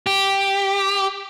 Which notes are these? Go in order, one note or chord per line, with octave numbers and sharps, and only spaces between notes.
G4